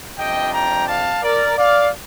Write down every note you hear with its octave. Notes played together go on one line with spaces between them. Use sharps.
F2 C3 G3 D4 D#5 G5
G5 A#5
F5 A5
A#4 D5
D5 F5